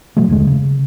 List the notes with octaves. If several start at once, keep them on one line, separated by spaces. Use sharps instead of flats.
B2 F3 F#3 A3
F#1 D#2 D3 G#3
C#3